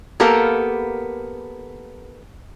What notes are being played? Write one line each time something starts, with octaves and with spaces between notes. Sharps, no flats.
A#3 B3 G4 A4 A#4 F5